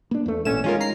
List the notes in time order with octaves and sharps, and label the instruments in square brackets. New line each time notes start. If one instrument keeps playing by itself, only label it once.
[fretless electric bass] A#3 D4
E2 A3
[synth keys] A1 C#4 E7 [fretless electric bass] A#2 A3
[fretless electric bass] D#3 G#3 [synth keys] C#4 F4 A#4
[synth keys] A#5 C7